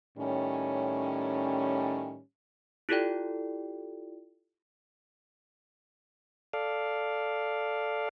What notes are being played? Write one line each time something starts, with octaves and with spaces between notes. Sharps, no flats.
A2 D#3 G3 C#4
E4 F4 G4 A4 D5 G5
A4 D5 F5